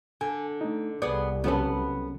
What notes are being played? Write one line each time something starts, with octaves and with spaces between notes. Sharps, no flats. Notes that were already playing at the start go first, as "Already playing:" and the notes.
D3 G#5
A3 D#4
C2 B3 G#4 D5
C3 F#3 B3 C#4 A4 B4